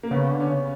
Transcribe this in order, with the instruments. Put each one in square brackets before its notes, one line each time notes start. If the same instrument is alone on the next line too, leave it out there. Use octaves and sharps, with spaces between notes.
[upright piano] A#3
[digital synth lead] C#3 [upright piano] B3
[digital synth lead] D3
[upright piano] C#4
[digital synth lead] C#3